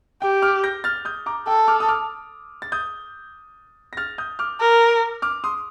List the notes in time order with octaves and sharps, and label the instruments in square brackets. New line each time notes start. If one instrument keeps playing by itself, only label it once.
[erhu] G4 [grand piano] G5
[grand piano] D6 F6
G6 A#6
F6 A6
D#6 G6
A#5 D6
[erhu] A4 [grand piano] G5
[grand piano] D6 F6
D#6
D6 F6
A6
D#6 G6
A#6
F6 A6
D#6 G6
D6 F6
[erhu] A#4
[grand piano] D6 F6
C6 D#6